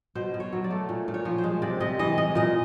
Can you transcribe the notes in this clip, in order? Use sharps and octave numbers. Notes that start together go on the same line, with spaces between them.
B2 C5
B2
C#5
F#3
D5
A3
A#2
A#2
C#5
F3
C5
G#3
C3 D5
C3 D#5
E3 D#5
G#3 D#5
A#2 D#5